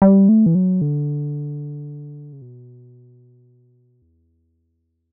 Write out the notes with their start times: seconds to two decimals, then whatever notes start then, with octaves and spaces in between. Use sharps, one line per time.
0.02 G3
0.29 A3
0.46 E3
0.55 F#3
0.81 D3
2.33 C#3
2.42 B2
4.02 E2